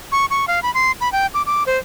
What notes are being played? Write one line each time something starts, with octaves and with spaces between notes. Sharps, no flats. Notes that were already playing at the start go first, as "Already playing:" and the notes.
C#6
C#6
F5
B5
C6
B5
G5
D6
D6
C5